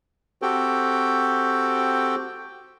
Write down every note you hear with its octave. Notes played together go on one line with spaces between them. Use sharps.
C4 F#4 G4 A4 G5